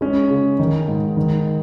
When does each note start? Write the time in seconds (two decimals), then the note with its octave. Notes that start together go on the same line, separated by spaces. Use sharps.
0.01 G#3 C#4
0.31 C#3
0.59 D#3
0.88 G#2
1.17 D#3